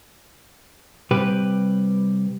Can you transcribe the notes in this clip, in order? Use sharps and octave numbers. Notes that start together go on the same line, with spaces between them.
C3 G3 G4 B4